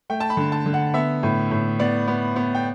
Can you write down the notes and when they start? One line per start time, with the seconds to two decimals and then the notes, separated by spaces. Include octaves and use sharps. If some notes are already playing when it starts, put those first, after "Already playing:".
0.10 A3 G5
0.20 A5
0.30 B5
0.37 D3
0.52 A5
0.66 D3
0.74 F#5
0.94 B3 E5
1.23 A2
1.51 A2
1.79 B3 D5
2.08 B3
2.36 B3
2.55 G5